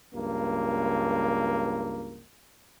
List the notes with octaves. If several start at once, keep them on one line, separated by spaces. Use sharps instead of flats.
C#2 G2 A#3